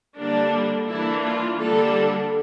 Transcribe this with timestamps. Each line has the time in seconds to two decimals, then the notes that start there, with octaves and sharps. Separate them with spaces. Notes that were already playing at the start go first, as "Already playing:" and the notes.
0.18 D3 G3 A#3 D4
0.88 E3 A#3 D4 E4
1.24 F4
1.59 D3 G3 A#3 D4 A4